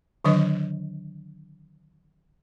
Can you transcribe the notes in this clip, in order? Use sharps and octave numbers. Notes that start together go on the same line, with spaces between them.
D3 D#3 F#3 D4 B4 D#5